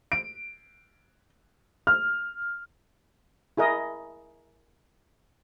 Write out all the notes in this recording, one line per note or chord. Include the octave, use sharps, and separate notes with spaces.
D7
F6
E4 G#4 A#4 D#5